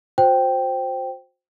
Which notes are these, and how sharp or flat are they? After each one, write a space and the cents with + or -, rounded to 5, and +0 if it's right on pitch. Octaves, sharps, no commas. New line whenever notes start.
F#4 -40 C5 +0 G5 -5